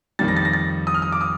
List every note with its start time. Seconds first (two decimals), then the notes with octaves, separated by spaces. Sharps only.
0.19 F2 D#3 G3 A6
0.28 A#6
0.37 A6
0.45 A#6
0.53 A6
0.87 D#6
0.94 F6
1.02 D#6
1.12 D6
1.21 D#6